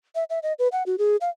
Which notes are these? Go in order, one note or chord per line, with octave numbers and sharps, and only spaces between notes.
E5
E5
D#5
B4
F#5
F#4
G#4
F5